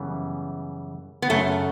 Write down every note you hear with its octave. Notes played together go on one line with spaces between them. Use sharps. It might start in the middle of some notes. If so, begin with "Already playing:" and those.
Already playing: F#2 C#3 E3 G3 B3
B3
F#2 C#3 F#3 A3 C#4